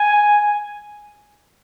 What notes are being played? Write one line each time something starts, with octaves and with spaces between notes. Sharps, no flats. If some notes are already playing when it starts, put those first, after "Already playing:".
Already playing: G#5